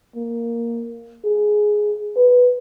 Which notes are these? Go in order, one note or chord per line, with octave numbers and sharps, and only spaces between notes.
A#3
G#4
B4